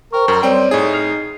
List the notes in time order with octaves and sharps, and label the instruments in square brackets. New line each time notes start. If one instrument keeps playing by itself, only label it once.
[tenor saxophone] A#4 [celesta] C5 G5 C#6
[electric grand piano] F#2 [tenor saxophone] A#4
[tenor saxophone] G3 [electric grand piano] C4 G5 [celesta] C#5 C6
[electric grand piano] A2 G#4 [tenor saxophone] D#4
[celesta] F6 C7 F7